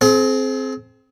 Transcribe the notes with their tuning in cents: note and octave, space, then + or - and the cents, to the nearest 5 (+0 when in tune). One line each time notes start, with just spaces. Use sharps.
C4 +0 G#4 +40